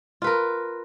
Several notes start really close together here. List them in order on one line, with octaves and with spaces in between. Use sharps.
F4 B4 A#4